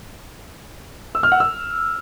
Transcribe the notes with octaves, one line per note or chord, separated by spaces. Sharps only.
E6
F6
F#5
E6